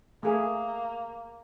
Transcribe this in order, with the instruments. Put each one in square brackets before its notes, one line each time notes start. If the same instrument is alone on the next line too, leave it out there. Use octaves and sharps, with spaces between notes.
[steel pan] A3 G#4 A#4 [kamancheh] A#3